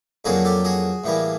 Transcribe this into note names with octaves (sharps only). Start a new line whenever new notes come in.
F2 D3 F#3 A#3 F#4 G#4
G4 A4
F#4 G#4
A2 E3 G3 A#3